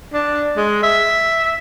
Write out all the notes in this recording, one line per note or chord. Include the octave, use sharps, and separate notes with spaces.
D4
G#3
E5